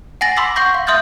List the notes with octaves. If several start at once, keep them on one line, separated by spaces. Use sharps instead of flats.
F#5 G#5 A6 A#6 F#7
B5 C6 D6 E6 B6 C7
F#5 C6 C#6 G6 A#6
F5
E5 C6 D#6 F6 G6 A6